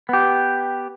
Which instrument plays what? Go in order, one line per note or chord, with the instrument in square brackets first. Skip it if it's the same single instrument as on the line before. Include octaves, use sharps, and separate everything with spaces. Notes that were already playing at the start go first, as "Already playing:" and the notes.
[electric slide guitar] B3 G4